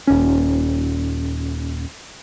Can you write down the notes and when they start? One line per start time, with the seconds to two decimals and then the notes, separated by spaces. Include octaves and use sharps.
0.07 D#1 C#4